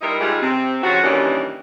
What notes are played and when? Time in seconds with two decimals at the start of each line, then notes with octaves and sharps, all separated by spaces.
0.02 A#2 G3 D#4 E4 A#4
0.20 G#2 G3 G#3 F4 G4 G#4
0.41 C3 C4
0.83 C#3 F3 F#3 F#4
1.03 G2 A#2 D#3 E3 G3 C#4